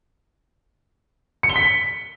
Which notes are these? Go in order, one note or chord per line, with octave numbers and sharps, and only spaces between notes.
C#7
G7
B6